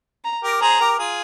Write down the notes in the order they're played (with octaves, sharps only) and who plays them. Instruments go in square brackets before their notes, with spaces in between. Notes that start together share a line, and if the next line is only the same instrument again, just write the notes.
[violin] A#5
[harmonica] G4 A#4
[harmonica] G#4 C5 [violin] A#5
[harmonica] G4 A#4
F4 G#4